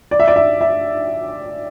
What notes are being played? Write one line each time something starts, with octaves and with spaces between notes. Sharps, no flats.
D5
E5
D5
E5
E5